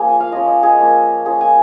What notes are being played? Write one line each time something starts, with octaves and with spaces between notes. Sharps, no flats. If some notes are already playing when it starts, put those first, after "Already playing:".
Already playing: F3 A#3 C#4 F4 G#4
G#5
F5
G#3 C#4 F4 D#5
D#5
G#4
F3 A#3 F4
A#3 C#4 F4 G#4
G#5